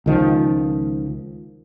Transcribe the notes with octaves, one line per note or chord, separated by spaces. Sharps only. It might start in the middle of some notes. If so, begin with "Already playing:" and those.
C#2 D#3 F3